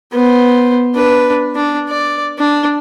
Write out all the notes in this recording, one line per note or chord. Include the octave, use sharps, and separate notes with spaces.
B3 C5
D4 B4
D4
D5
D4